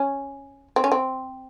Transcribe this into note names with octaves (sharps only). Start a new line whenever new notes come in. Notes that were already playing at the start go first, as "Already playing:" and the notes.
Already playing: C#4
C4
C#4
C4